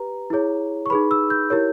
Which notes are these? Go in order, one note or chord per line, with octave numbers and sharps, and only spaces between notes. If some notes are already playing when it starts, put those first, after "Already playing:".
Already playing: G4 B4 A#5
E4 G#4 C#5
C#6
D#4 G#4 B4 B5
E6
G6
E4 G4 A#4 C#5